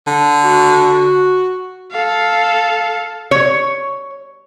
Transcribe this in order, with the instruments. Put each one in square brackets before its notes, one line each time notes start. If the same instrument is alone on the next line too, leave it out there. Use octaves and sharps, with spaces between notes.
[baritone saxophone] D3
[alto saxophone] F#4
[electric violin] A4 F5
[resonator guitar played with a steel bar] C#5